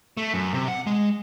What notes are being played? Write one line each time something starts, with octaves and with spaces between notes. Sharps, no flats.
A3
F#2
C3
F#5
G#3